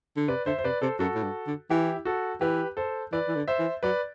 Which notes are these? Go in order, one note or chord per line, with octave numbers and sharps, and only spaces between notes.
D3
C3 B4 D5
D3 C5 E5
C5
C3 B4 D5
C3 A4 C5
F#2 F#4 A4
A2
G2
D3
E3 E4 G4
F#4 A4
E3 G4 B4
A4 C5
E3 B4 D5
E3
D3
C5 E5
E3
F#3 B4 D5